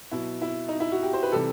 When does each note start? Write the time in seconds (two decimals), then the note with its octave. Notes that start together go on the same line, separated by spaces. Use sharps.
0.11 B2 F#3 E4
0.42 E4
0.68 D#4
0.80 E4
0.92 F#4
1.03 G4
1.13 C5
1.22 B4
1.32 C3 E3 G3 A4